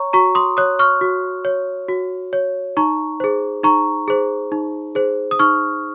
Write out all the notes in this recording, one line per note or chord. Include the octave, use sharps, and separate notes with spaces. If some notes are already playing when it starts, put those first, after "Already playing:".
Already playing: C#5 A#5 C#6
F#4 A#5 C#6
C6 D#6
C#5 D#6 F#6
C#6 F6
F#4
C#5
F#4
C#5
D#4 A#5 C#6
G#4 C5
D#4 A#5 C#6
G#4 C5
D#4
G#4 C5
D#6
D#4 C#6 F6